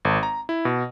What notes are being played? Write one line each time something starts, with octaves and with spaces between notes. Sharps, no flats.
G#1
A#5
E4
B2